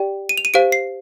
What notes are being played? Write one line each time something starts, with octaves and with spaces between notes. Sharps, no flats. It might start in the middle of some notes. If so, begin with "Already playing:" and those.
Already playing: G4 D5 G5
D#7
F7
D#7
G4 C5 F5 D7
C7